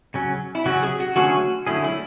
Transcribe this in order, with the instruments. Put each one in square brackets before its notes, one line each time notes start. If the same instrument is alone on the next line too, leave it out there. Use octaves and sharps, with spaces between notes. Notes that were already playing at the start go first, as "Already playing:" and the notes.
[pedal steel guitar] C#3 F#3 C#4
[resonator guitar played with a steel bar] E4
[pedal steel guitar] C#3 F#3 C#4 [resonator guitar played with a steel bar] F#4
[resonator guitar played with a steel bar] G#4
F#4
[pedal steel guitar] D3 F#3 A3 C#4 G#4 [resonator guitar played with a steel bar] F#4
[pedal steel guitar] D3 F#3 A3 C#4 G#4 [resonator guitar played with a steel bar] E4
[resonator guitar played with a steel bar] E4